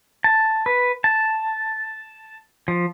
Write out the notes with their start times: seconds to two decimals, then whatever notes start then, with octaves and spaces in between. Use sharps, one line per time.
0.24 A5
0.66 B4
1.04 A5
2.68 F3